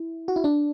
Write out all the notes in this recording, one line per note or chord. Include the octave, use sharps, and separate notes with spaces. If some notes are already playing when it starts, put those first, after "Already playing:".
Already playing: E4
F#4
E4
D4